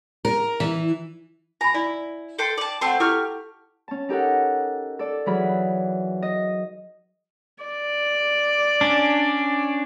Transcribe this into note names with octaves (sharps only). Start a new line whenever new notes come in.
A#4
E3
G#5 A#5 B5
E4 D5
A4 G5 C6
D5 A5
A3 C4 F#5 A5 C6
E4 G4 A4 C#6 F6
C#4 A5
D#4 G4 A4 A#4 F#5
A4 D5
E3 F#3 G#4 B5 F6
D#5
D5
C#4 D4